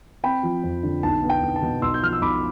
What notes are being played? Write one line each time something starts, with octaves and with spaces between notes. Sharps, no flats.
C4 G5 B5
F3
F2
D3
B1 A5
B3
G5
B1
A5
B2
B1 C6 E6
G6
F3 F6
E6
B1 B5 D6